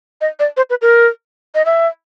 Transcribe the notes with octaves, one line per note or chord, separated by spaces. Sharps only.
D#5
D5
C5
B4
A#4
D#5
E5